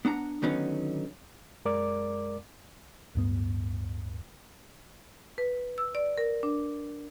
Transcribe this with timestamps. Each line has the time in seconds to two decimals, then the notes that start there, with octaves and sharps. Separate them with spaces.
0.05 B3 D4 F#5 A#5
0.42 D3 D#3 F#3 B3 C#4 D#4
1.65 F#2 G#3 A#4 D5 D6
3.15 D1 G2 B3
5.38 B4
5.78 E6
5.95 D5
6.18 A#4
6.43 D4